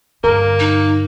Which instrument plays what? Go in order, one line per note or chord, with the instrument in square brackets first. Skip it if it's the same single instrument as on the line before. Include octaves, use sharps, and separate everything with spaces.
[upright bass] G2 D3 [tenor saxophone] A#3 [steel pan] A#4
[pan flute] D#4